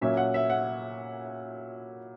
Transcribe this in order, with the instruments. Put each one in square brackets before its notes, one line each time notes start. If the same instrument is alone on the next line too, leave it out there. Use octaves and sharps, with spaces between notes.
[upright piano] A#2 F#3 C#4 E5
F#5
E5
F#5